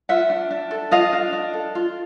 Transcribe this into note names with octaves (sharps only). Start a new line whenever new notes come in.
F4 E5 F#5
D4
D4
A4
F4 D#5 F5
D4
D4
A4
F4